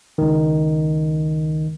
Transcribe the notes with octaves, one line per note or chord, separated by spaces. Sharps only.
C#2 D#3